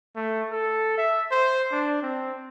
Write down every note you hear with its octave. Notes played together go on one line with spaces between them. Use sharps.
A3
A4
E5
C5
D4
C4